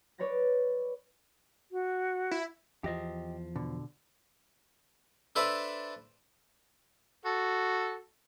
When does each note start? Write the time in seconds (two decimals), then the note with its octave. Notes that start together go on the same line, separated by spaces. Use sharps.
0.18 B4 C#5 D5 B5 A6 A#6
1.72 F#4
2.31 E4
2.84 E2 F3 G4 D#5
3.56 B2 D3
5.36 D4 A4 B4 C5 D5 E5
7.25 F#4 A4